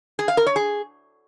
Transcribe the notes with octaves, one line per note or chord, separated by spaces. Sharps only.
G#4
F5
A#4
C#5
G#4